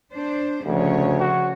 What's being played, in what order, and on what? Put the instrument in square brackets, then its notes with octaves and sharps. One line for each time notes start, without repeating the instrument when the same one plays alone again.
[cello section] D4 C5
[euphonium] D2 [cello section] C#3 F3 C#5
[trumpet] F#4